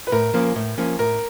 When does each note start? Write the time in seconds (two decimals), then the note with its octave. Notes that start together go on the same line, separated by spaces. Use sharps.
0.07 B4
0.12 A2 A#4
0.34 F3 A#3 C#4
0.56 A2
0.78 F3 A#3 C#4
0.99 A2 A#4